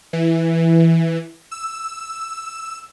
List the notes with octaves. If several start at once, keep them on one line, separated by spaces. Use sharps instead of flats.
E3
E6